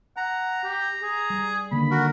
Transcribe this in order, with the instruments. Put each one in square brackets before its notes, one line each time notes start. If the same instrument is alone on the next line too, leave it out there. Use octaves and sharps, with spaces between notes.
[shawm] F#5 [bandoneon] A#5
[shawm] G4
G#4
[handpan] G3
[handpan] D3 D#3 A#3 [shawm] B5
[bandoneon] F#4 A#4